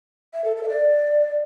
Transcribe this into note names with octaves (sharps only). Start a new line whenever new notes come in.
E5
A4
A4
E5
D5